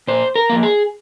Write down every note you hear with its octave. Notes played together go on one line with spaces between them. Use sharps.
A#2 C5
A#4
F3 A#3
G#4